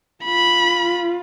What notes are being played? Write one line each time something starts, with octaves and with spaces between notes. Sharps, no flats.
F4 B5